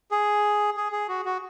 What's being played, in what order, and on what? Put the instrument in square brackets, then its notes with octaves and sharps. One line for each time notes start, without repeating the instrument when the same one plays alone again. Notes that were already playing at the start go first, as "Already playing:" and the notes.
[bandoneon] G#4
G#4
G#4
F#4
F#4